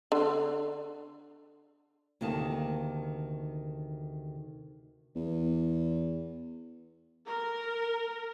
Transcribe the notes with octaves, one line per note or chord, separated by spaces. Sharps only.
D3
D2 C3 D#3 A#3 A5
E2
A#4